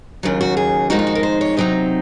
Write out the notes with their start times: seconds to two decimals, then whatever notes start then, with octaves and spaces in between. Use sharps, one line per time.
0.23 D#2 C#3 F#3 F4
0.41 F#4
0.57 G#4
0.90 F2 D#3 G#3 D#4 F#4
0.99 F4
1.07 F#4
1.15 A#4
1.23 C5
1.41 C#5
1.57 C3 F#3 C4 D#4 D#5